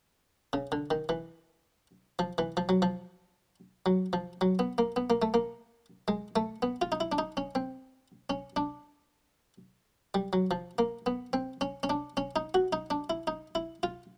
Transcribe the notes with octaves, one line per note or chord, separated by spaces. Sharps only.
C#3
D3
D#3
E3
F3
E3
F3
F#3
F3
F#3
F3
F#3
B3
A#3
B3
A#3
A3
A#3
G#3
A3
B3
F4
D#4
E4
D4
D#4
C#4
C4
C#4
D4
G3
F#3
F3
A#3
B3
C4
C#4
C#4
D4
C#4
D#4
F#4
D#4
D4
E4
D#4
E4
F4